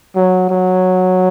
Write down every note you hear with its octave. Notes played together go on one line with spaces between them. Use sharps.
F#3
F#3